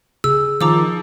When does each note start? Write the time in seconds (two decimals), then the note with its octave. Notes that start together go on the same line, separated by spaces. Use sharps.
0.24 C#3 G#4 E6
0.61 D#3 F3 A#5 D6 E6